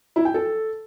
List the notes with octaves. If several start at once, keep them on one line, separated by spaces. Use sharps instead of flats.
E4
G5
A4